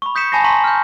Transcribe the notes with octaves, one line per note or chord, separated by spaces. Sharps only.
B5 C#6
D#6 G6 B6 C#7 E7
G#5 A5 B5 C#6 A#6 C7
A5 A#5 C6 C#6 B6 D#7
F6 G6